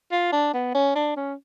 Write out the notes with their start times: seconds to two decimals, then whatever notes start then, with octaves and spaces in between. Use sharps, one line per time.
0.12 F4
0.32 D4
0.54 B3
0.75 C#4
0.95 D4
1.16 C#4